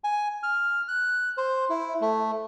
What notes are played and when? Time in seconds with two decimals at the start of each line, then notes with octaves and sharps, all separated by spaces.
0.04 G#5
0.43 F6
0.88 F#6
1.37 C5
1.69 E4
2.01 A3